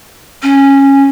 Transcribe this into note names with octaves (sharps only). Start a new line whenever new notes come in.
C#4